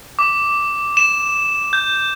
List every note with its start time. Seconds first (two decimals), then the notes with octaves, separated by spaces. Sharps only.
0.19 D6
0.97 E7
1.73 G6